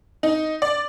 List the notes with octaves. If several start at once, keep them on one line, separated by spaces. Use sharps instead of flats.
D#4
D5